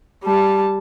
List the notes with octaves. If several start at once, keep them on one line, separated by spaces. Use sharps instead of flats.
G3 A5